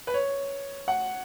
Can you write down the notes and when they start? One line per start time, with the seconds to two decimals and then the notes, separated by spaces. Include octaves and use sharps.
0.07 B4
0.14 C#5
0.88 F#5